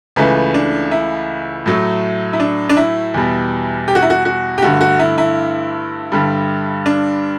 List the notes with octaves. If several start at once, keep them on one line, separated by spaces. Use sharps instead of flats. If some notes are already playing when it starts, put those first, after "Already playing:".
C#2 C#3 E3 A3 B4
D4
E4
A2 F#3 A3
E4
D4
D4
E4
E2 B2 G3
G4
F#4
E4
F#4
F#4
G4
G2 D3 A3 F#4
F#4
E4
E4
G2 D3 G3
D4